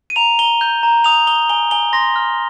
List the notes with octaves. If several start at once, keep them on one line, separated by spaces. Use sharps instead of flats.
D#7
A#5 F7
A#5 G7
G6
A#5
D#6 F7
D#6 G7
G#5 G7
G#5 G7
C6 A#6
F6